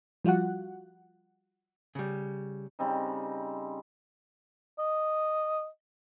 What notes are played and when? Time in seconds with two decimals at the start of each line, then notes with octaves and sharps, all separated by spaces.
0.25 F3 G3 F4 F#4 F#5
1.95 C#3 G3
2.79 C#3 G3 C4 D#4
4.79 D#5